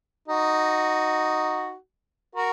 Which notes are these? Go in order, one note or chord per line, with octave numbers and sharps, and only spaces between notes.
D#4 F#4
F#4 A#4